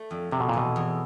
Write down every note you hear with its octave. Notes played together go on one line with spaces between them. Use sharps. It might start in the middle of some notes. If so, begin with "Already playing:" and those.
Already playing: A3
F2
F2 C3
B2
A#2
B2 E3
E2